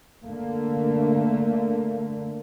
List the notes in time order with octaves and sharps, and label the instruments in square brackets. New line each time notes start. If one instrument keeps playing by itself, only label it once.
[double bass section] D3 A3 A#3